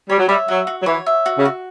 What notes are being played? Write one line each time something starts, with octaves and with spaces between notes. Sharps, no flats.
G3 C#5
F#3
G3 E5
F#3 F#4
F#4
F#3
E3 C#5
E5
F#4
C#3
F#4